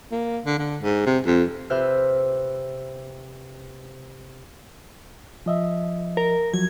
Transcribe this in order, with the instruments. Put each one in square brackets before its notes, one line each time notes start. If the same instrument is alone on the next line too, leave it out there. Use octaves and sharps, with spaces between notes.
[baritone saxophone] A#3
D3
D3
G#2
C3
F2
[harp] C3 B4 C5 E5 F6 G6
[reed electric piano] F3 D#5 E5
[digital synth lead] A#4
[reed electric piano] F3 F#3 [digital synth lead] G#6